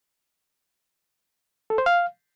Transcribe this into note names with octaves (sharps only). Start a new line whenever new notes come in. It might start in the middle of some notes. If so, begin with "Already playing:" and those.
A4
C5
F5